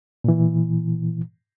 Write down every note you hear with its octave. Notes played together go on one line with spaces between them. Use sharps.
A#2 E3